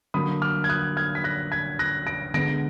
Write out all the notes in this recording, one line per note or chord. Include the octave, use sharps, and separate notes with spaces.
D3 F#3 A#3 B5 D#6
D6 F6
G#6
D#6 F#6
F6 G#6
B6
F#6 A#6
G#6 B6
F#6 A#6
A#6 D7
D3 G#3 B3 A#6 D7